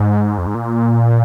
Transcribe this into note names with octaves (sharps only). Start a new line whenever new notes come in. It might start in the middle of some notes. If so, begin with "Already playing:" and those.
Already playing: G#2
F2
G#2
A#2